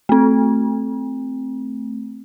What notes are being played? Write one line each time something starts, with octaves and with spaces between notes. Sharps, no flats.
A3 C4